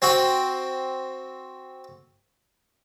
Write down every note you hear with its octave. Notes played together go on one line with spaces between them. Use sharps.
C4 F#4 G5